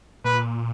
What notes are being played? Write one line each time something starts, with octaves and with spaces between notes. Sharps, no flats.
A#2 B4